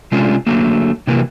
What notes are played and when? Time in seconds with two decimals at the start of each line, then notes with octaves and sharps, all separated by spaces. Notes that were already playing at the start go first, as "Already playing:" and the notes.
0.12 C3 G#3 A3 C#4 D4 F4
0.47 D3 F#3 A3 A#3
1.07 C3 E3 F#3 A#3